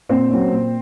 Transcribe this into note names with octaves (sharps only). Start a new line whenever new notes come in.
A#2 C4 C5
F#3 A#3 C#4
A#2